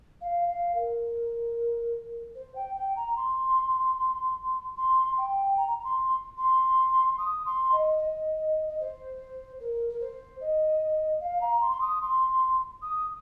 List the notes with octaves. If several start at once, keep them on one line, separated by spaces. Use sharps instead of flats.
F5
F5
A#4
C5
G5
G5
A#5
C6
C6
G5
A#5
A#5
C6
C6
D#6
C6
D#5
D#5
D#5
C5
A#4
A#4
C5
D#5
F5
A#5
C6
C6
D#6
C6
D#6